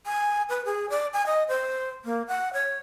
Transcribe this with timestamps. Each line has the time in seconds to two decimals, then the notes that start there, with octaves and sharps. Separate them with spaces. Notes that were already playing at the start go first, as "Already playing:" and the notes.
0.06 G#5
0.49 B4
0.65 G#4
0.90 D5
1.13 G#5
1.26 D#5
1.48 C5
2.05 A#3
2.28 F#5
2.53 C#5